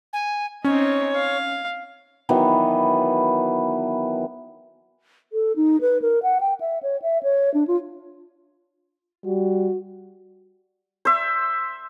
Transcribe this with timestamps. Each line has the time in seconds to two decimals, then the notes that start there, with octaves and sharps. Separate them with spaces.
0.13 G#5
0.64 C4 C#4 D#4 C#5
1.16 F5
2.29 D#3 E3 F#3 B3
5.33 A4
5.56 D#4
5.81 B4
6.02 A#4
6.23 F#5
6.41 G5
6.61 E5
6.83 C#5
7.02 E5
7.23 C#5
7.54 D4
7.68 F4
9.26 G3 F#4
11.05 C5 E5